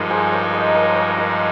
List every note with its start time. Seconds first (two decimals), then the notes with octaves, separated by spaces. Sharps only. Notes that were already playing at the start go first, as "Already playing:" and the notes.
Already playing: G2 F3 G#3 D#4 A#4
0.10 G#4 C5
0.32 A#4 C#5
0.53 C5 D#5
0.75 A#4 C#5
0.96 A#4 C#5
1.18 C5 D#5